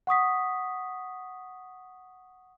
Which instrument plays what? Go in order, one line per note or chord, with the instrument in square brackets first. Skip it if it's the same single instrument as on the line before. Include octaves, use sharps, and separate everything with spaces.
[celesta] F#5 C#6 D#6 B6